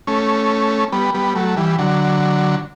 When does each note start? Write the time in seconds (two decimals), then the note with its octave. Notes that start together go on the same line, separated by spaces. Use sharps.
0.07 A3 C#4
0.92 G3 B3
1.14 G3 B3
1.35 F#3 A3
1.57 E3 G3
1.78 D3 F#3